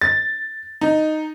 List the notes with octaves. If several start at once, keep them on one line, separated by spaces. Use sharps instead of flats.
A6
D#4